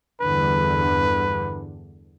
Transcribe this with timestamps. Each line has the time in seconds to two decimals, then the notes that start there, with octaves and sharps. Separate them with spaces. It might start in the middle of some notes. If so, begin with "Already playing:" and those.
0.21 E2 G2 D3 B4